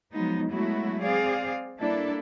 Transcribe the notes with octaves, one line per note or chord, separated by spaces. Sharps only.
F3 F#3 G#3 B3 D#4
F#3 G#3 A3 B3 E4 F#4
C4 G#4 D5 F5
G3 A#3 D4 E4 A4